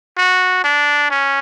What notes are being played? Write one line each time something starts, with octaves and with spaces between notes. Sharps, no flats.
F#4
D4
C#4